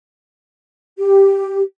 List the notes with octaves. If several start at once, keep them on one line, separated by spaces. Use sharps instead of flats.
G4